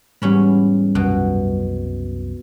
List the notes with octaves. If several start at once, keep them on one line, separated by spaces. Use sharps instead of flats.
E2 G#2 G3 C#4 B5
C2 F#2 B2